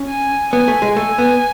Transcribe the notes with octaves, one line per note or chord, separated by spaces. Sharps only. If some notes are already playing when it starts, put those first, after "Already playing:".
Already playing: C#4
G#5
B3 G#5
A3
G#3
A3 G#5
B3